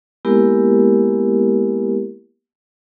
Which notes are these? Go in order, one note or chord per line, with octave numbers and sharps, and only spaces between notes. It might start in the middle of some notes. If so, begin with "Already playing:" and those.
G#3 A#3 B3 E4 G4 A#4